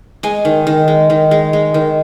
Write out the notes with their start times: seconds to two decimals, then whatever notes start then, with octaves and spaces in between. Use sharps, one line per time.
0.23 G#3 G#5
0.45 D#3
0.67 D#3
0.88 G#3
1.10 D#3
1.31 G#3
1.53 G#3
1.74 D#3